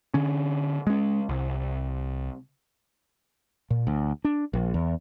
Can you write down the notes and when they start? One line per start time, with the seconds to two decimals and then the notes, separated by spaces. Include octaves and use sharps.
0.14 D3 C#4
0.87 G#3 C#4
1.29 C2
3.70 A#2
3.87 D2
4.25 D4
4.53 A#1
4.74 E2